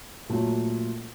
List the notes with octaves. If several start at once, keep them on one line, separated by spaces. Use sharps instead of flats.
A#2 F#3 A3